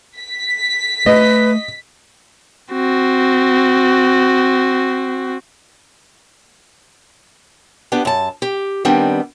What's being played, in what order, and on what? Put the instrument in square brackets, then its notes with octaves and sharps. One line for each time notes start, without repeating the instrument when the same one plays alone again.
[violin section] B6
[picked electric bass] A3 [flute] B4 [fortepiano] D#5
[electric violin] C4 F#4
[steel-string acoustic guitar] B3 D4 G4
F#2 A5
G4
D#3 G3 B3 C4 D4